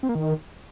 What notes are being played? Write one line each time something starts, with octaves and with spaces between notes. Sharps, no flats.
C4
A#3
D#3